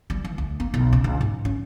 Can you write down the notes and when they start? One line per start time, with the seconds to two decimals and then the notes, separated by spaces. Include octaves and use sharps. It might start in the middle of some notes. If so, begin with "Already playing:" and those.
0.10 G3
0.25 E3
0.38 D2
0.60 A#3
0.74 B1
0.93 C#3
1.04 C#2
1.21 G#2
1.45 C#4